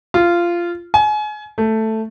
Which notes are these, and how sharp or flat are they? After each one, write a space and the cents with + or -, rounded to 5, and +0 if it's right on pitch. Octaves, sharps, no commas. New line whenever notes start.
F4 -15
G#5 +30
A3 +5